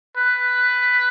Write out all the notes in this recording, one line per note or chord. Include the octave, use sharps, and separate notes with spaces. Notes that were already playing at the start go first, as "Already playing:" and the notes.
B4